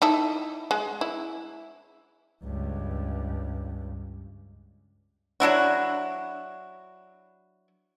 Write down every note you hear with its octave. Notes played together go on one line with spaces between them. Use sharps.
D#4 E4 A4
G#3
E4
C#2 G2
F#3 D4 E4 F#4